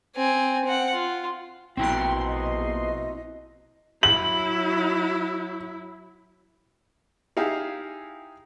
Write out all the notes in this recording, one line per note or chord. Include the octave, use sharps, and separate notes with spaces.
C4 G#5
C4 F#5
F4
A#1 B2 C4 E4 F#4 G5 C6
D#5
F#3 E4 F#7
D#4 E4 G4 G#4 F5